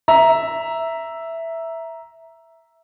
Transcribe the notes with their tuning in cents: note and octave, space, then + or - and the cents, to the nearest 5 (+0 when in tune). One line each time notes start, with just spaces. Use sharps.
E5 +0 A#5 +5